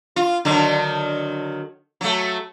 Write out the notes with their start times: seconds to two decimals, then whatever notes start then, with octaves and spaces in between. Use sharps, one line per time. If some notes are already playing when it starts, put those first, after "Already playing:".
0.16 F4
0.45 D3 D#3 F#3
2.01 F#3 A3